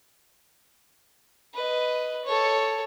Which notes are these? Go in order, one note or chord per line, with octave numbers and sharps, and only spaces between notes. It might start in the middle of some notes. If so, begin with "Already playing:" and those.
B4 D#5
A4 C#5